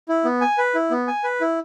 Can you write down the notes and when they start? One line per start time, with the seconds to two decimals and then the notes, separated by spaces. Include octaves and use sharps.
0.09 E4
0.25 B3
0.41 G#5
0.58 B4
0.75 E4
0.91 B3
1.07 G#5
1.24 B4
1.41 E4